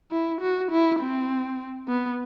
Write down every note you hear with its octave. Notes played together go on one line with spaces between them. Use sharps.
E4
F#4
E4
C4
B3